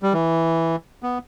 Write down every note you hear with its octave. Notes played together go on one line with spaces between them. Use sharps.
G3
E3
B3